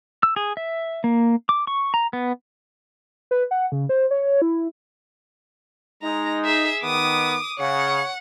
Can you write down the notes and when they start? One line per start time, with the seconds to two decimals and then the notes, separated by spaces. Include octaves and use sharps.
0.23 E6
0.36 G#4
0.57 E5
1.04 A#3
1.49 D6
1.67 C#6
1.94 A#5
2.13 B3
3.31 B4
3.51 F#5
3.72 C#3
3.89 C5
4.11 C#5
4.42 E4
6.03 G#3 D#4 A#5
6.45 G#4 E5
6.83 D#3 B3 D6 D#6
7.60 C#3 C#5 F#5